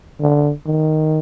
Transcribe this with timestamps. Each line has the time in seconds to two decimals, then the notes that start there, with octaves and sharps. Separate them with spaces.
0.20 D3
0.67 D#3